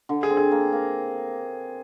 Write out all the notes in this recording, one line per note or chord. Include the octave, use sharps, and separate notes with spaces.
D3
G#4
C4
G#4
A#3
A#3